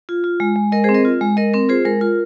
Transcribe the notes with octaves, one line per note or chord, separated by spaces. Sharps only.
F4
F4
G#3
G#3
G#3 A#4 D#5
G#4 C5
C4
A#4 D#5
F4
G#3
G#3 A#4 D#5
C4 A#4
F4 G#4 C5
G#3 A#4
F4 A#4